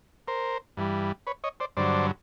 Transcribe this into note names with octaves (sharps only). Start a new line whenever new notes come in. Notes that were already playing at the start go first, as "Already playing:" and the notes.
A#4 C5
G2 E3 G3
B4 C#5
C#5 D#5
C5 D5
G2 D3 F#3 C5 D5